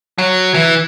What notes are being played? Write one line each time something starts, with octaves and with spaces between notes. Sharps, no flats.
F#3
E3